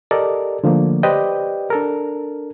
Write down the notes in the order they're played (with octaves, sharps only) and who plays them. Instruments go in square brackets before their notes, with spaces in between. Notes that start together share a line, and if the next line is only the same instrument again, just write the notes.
[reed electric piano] G4 A4 A#4 D5 D#5
D3 F3 A3 A#3
G4 B4 C5 D5 D#5 G5
D4 A4 A#4